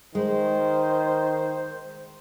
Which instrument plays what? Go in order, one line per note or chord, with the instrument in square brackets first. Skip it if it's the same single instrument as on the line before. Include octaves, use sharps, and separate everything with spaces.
[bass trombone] D#3 [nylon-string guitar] G#3 [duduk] C5